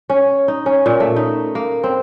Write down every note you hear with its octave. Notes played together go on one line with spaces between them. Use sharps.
C#4
D#4
C#4
A#2
A3
D#4
A#3
C4